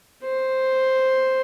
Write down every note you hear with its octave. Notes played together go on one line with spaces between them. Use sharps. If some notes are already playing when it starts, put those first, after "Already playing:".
C5